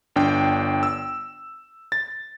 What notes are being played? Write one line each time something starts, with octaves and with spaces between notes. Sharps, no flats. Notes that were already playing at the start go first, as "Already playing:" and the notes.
G1 D4 G5
E6
A6